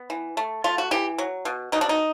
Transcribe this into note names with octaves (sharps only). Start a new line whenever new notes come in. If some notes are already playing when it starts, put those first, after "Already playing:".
Already playing: B3
E3
A3
A3 F4
F#4
E3 G4
F#3
B2
B2 D#4
D4
D#4